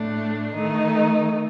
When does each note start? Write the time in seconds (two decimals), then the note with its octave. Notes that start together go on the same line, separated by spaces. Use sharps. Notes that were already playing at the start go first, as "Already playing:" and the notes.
Already playing: A2 A3 D4
0.54 D#3 A3 D#4